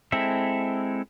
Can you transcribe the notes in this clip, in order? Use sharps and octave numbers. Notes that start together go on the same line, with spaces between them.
G#3 C4 E4 A4 E5